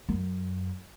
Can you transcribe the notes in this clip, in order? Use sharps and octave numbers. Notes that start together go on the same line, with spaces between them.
F#2